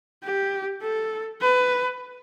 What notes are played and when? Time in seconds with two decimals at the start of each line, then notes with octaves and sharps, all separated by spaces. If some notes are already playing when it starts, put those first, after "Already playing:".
0.23 G4
0.82 A4
1.41 B4